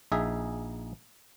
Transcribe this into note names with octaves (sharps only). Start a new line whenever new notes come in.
A#1 D#4 G#4 E5